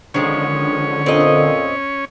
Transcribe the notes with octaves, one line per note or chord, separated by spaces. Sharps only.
D3 D#3 F3 G#3 C#4 C#5
F2 A#2 C4 D#5